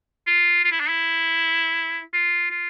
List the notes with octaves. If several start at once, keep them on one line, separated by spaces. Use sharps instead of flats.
F4
F4
E4
D4
E4
F4
F4